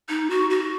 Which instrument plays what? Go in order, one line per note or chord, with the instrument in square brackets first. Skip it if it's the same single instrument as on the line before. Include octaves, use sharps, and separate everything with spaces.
[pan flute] D#4
F#4
F#4